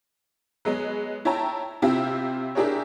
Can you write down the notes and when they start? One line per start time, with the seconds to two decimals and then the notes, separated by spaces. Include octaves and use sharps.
0.65 F#3 G#3 B3
1.25 E4 C#5 G5 A5 A#5
1.82 C3 C4 E4 F4 G4
2.55 D4 E4 G4 G#4 A#4 C#5